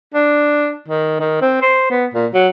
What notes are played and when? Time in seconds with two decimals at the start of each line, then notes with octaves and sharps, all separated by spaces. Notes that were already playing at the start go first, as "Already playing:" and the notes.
0.14 D4
0.88 D#3
1.20 D#3
1.42 C4
1.62 C5
1.91 B3
2.14 A#2
2.34 F#3